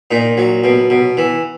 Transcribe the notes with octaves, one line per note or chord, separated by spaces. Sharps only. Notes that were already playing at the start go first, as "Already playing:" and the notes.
A#2 D#4
F#3
B2
B2
E3